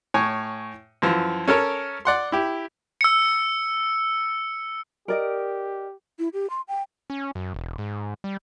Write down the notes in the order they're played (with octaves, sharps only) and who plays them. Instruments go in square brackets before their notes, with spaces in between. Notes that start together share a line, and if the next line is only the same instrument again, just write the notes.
[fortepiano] A2 C#5 G#5
F#2 E3 F3
C#4 A4 A#4 C#5
D5 F#5 C6
E4 G4
[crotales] E6 C#7
[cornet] G4 [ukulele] A#4 D5 D#5
[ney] E4
G4
C6
G5
[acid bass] C#4
F#2
E1
G#2
G3